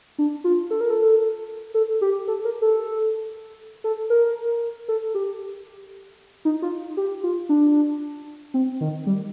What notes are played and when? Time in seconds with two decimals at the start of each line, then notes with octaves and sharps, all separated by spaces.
0.18 D4
0.44 F4
0.71 A4
0.81 A#4
0.91 A4
1.74 A4
2.01 G4
2.28 A4
2.45 A#4
2.62 A4
3.84 A4
4.10 A#4
4.88 A4
5.15 G4
6.45 D#4
6.62 F4
6.97 G4
7.24 F4
7.49 D4
8.54 C4
8.81 D#3
9.06 G3